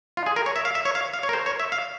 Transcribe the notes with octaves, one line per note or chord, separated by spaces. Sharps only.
F4
G#4
A#4
C#5
E5
F5
E5
C#5
F5
F5
C#5
A#4
C5
C#5
E5
F5